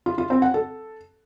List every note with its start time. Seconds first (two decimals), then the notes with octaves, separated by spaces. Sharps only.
0.06 F4
0.18 F4
0.30 C4
0.42 F#5
0.54 A4